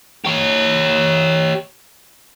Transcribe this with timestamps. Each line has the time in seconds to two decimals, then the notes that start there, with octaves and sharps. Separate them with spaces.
0.25 G4 C#5